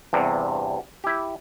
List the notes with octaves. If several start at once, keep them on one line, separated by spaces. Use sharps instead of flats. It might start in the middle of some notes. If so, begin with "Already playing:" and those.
E2 G2 C3
E4 G4